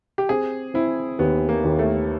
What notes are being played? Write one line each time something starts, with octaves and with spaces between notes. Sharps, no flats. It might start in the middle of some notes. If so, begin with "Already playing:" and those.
G4
C4 G#4
C4 E4
D#2 B3
A#3
D#2
A3